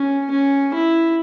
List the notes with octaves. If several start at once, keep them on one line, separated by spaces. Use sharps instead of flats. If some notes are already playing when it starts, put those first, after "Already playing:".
Already playing: C#4
C#4
E4